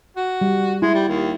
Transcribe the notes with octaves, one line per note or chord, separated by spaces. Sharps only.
F#4
G3
G#3 E4
G3
D#2